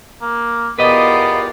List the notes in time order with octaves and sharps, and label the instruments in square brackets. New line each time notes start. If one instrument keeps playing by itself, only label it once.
[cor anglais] A#3
[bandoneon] E2 G4 D5 [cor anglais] B3 [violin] F4 A#4 [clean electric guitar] B4 D#5